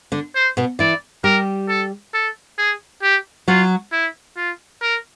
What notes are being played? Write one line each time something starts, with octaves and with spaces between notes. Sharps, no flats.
D3 D4
C5
B2 B3
E3 E4 D5
G3 G4 A#4
A4
A4
G#4
G4
F#3 F4 F#4
E4
F4
A#4